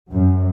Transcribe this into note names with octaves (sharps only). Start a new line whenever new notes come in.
F#2